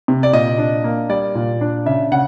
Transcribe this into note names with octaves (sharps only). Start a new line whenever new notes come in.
C3
D5
A#2 D#5
D4
A#3
G3 D5
A#2
D4
C#3 E5
C#3 F#5